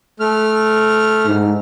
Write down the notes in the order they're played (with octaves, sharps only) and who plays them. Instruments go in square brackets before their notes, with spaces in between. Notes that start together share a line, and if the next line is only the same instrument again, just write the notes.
[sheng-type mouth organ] A3 F6
[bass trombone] G#2